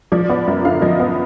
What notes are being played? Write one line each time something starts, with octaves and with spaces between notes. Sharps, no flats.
F3 D5
B3 D5
F#2
D3 F5
F3 D#5
B3